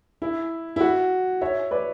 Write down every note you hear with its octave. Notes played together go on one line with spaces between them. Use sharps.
E4
E4
F#4
C#5 E5
B4 D5